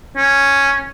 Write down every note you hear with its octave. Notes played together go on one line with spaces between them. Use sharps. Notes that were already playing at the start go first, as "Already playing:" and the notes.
C#4